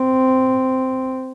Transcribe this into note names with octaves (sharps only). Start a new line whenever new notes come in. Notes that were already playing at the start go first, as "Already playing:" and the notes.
Already playing: C4